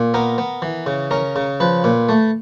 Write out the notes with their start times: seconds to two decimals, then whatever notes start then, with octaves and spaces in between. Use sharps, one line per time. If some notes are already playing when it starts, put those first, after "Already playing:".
Already playing: A#2
0.14 B3 A#4
0.38 B3
0.62 E3
0.86 C#3
1.11 C#4 A#4
1.36 C#3
1.60 F3 B4
1.84 A#2
2.09 A3